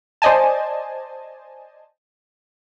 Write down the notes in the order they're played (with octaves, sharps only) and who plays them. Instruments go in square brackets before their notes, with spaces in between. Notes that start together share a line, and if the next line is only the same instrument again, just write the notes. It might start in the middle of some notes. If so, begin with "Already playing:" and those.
[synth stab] C5 D5 D#5 G#5 A5